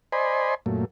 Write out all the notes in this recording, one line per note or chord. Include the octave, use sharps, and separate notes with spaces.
C5 D5 D#5 G#5 B5 C6
F#2 A#2 A3